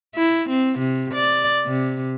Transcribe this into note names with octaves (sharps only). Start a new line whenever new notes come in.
E4
C4
C3
D5
C3